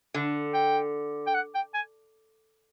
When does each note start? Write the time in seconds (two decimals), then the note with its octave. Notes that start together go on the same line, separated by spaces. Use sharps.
0.14 D3
0.54 G5
1.27 G5
1.34 F#5
1.54 G5
1.74 G#5